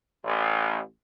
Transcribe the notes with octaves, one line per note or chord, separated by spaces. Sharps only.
A1